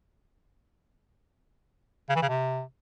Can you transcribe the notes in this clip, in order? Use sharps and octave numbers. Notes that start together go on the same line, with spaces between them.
C#3
E3
C#3
C3